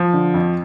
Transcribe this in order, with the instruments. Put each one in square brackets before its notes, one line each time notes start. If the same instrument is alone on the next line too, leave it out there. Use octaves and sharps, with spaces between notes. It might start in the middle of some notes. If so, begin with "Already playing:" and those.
Already playing: [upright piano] F3
D3
F2